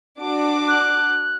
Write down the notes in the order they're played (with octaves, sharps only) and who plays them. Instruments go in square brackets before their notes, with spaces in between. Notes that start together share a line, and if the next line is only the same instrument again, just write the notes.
[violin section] D4 F#4 D6
[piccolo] F#6